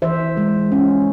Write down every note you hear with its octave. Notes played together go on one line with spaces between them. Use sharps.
E3 C5 E5
G#3
C#4